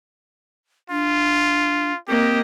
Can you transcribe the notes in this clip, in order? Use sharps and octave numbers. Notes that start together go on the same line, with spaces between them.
D4 F4
A#3 C4 G4 D#5